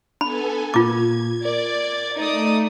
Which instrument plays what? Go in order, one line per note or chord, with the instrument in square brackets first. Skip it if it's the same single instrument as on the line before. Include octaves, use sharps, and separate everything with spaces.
[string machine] B3 A4 G#5 [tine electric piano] D4 [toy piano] B5
[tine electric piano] A#2 A#3 A6 [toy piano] F4 D6 [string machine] G#6
[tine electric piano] A#4 [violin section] D5
[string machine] A3 [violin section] D#4 D5 D#6